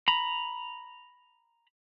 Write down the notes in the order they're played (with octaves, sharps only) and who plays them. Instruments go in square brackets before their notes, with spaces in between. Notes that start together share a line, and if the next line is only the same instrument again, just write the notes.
[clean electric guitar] A#5 B5